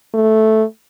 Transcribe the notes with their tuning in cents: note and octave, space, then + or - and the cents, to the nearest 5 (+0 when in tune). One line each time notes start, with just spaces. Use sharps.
A3 -5